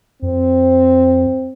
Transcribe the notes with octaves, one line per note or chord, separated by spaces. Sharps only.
F2 C4